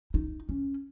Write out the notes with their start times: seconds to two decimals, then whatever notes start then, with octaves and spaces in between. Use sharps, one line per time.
0.14 D#4
0.49 C#4